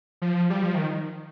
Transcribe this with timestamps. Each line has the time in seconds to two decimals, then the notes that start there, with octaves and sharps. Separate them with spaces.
0.22 F3
0.50 G3
0.63 F3
0.75 D#3